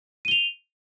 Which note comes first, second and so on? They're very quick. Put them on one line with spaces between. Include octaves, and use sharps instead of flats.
D#7 G7 F7